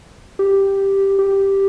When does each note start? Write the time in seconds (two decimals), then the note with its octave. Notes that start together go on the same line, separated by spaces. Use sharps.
0.39 G4
1.19 G4